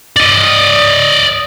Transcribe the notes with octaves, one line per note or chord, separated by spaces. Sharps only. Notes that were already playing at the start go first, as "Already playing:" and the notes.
D5 D#5